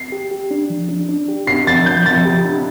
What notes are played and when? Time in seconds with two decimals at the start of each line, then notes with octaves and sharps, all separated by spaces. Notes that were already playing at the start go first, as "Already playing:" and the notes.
Already playing: C7
0.12 G4
0.31 G4
0.51 D4
0.70 F3
0.89 D4
1.09 D4
1.29 G4
1.47 D4 C7
1.67 F3 A6
1.86 F3 G6
2.05 F3 A6
2.25 G4
2.44 D4